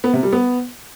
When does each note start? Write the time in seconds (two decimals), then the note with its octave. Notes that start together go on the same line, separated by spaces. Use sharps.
0.04 B3
0.13 C3
0.23 G3
0.32 B3